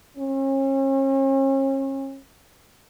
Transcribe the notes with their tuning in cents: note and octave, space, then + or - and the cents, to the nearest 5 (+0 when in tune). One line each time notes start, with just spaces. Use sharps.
C#4 -40